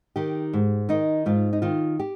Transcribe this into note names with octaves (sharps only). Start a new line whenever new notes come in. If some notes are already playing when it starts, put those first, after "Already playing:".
D#3 G4
G#2
D#3 D#4
G#2 F4
D#4
D#3 F4
G4